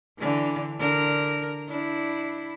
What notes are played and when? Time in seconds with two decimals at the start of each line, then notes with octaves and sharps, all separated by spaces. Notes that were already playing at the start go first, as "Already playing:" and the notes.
0.19 D3 E3
0.79 D3 A#4
1.69 D4 E4